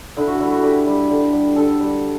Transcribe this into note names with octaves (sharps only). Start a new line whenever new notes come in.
D3 E4
F#4
G3 E4
F#4
D3 G4
G3
D3
G3
D3 A4
G3